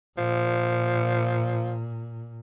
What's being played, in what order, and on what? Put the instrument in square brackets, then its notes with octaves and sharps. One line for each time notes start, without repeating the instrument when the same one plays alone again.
[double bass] A#2 [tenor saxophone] F3